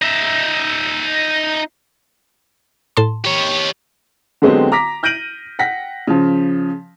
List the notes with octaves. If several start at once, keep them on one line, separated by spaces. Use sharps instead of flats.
D#4 E5
A2 A5 C6
G4 C#5
D3 F#3 G#3 B3 C4 G4
A#5 D6 A#6 B6
F6 G6 A#6 D7 D#7 F#7
F#5 G5 A#6 B6
C#3 F3